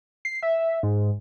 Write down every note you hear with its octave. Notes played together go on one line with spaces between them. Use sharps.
C7
E5
G#2